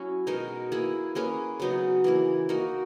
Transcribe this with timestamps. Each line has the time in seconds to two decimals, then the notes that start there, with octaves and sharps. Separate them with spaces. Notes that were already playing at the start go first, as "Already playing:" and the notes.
Already playing: F#3 C#4 E4
0.27 B2 G#3 D#4 A#4
0.72 A#3 E4 G#4
1.15 A#3 C#4 G#4 B4
1.60 C#3 F#3 B3 D#4
2.04 E3 A#3 E4
2.49 A#3 D#4 F#4 A#4